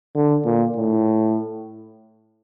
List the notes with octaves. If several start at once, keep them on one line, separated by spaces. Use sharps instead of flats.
D3
A#2
A2